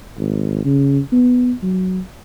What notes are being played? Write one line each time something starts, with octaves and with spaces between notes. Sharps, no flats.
G#1
C#3
B3
F#3